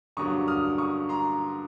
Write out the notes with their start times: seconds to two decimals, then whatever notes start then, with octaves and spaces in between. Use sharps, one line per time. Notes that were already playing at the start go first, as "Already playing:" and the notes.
0.17 G2 D3 F#3 A#3 C#6 D#6
0.48 D#6 F6
0.78 C#6 D#6
1.09 A#5 C6